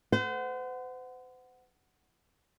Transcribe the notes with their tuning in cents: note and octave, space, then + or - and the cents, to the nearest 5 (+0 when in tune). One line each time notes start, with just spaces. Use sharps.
C5 -40 F#5 +0